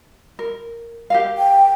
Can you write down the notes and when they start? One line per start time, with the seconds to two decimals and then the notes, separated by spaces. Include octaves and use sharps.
0.39 A#4
1.10 G4 A#4 F5
1.38 G5